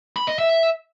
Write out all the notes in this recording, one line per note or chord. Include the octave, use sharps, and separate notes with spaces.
B5
D#5
E5